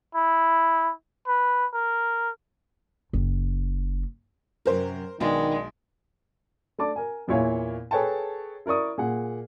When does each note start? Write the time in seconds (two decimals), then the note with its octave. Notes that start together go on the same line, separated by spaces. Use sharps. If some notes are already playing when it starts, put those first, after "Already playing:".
0.15 E4
1.27 B4
1.74 A#4
3.13 F#1
4.66 F#2 C3 F#3 A#4 C5
5.20 B1 D#3 G#3 B3 D4 D#4
6.79 A3 D4 D5 A5 D6
6.96 A#4 G#5
7.28 E2 A#2 E4 C#5 F5 G#5
7.91 G#4 A4 B4 C#5 G5 A5
8.66 E4 A#4 D5 C#6 D#6
8.98 A#2 G#4 F#5